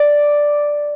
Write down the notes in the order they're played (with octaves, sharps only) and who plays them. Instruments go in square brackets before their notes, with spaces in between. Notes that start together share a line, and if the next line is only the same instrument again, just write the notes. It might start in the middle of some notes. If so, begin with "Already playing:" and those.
Already playing: [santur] D5